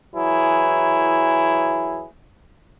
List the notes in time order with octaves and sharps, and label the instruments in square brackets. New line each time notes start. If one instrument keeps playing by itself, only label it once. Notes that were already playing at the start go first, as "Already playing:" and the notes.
[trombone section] E3 F#3 E4 G#4